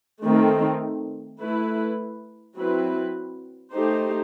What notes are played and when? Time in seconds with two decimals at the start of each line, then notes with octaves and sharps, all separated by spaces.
0.24 D#3 A3 C4 D#4
1.41 A3 E4 B4
2.57 F#3 C4 E4 B4
3.73 A3 D#4 G4 C5